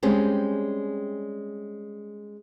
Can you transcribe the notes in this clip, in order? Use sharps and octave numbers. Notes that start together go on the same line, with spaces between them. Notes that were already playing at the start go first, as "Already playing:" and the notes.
G3 G#3 C4 C#4 G4